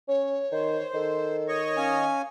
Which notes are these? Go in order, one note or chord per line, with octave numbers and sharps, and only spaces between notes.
C#4 C#5
D#3 C5
D#3 A4
C#5 D#5 C#6
C#4 F5 G#5